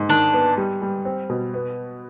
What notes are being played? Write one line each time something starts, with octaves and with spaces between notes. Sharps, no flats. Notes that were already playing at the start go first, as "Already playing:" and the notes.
Already playing: G#2
D#3 D4
B3
G3
G3
C4
B2
B3